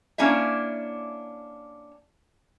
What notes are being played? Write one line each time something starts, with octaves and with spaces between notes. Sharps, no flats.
A#3 C#4 D4 E4 E5